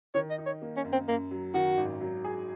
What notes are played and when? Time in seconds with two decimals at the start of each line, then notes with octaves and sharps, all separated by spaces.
0.14 D#3 C#5
0.30 D#5
0.38 D#4
0.46 C#5
0.62 A#3
0.77 C#4
0.85 F#2
0.92 C4
1.08 F#2 A#3
1.31 F#3
1.54 D#3 F#4
1.77 G#1
2.01 F#3
2.24 G#4